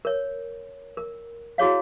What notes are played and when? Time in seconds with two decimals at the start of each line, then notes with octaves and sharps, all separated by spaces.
0.05 A#4 C#5
0.97 A#4
1.58 E4 F#4 G#4 C#5 F5